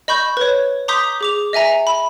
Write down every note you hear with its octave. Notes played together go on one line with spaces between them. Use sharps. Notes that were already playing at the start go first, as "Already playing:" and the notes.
D#5 B5 C#6 G6
B4 C#5
A#5 C6 D6 D#6 G6 B6
G#4 D6 F7
D#5 E5 G#5 A#5
B5